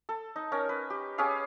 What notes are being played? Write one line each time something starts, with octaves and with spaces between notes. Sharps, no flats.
A4
D#4
C#4 A#4 G#5
B4
G4
C#4 G4 G#4 F5